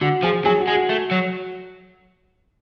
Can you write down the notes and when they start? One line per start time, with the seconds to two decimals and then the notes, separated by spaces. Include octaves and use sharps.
0.01 D3 F#4
0.23 F3 G#4
0.45 F#3 G#4
0.60 F#4
0.68 G#3
0.75 F#4
0.89 A3
1.11 F#3